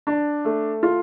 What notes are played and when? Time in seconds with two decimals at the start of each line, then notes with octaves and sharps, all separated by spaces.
0.07 D4
0.45 A3
0.83 F4